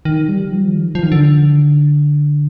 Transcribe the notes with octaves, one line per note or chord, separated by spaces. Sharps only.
D#3
G3
F3
D#3
F3
D#3
D3